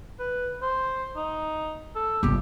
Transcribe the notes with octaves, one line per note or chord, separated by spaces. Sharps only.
B4
C5
D#4
A4
G1 C2 G4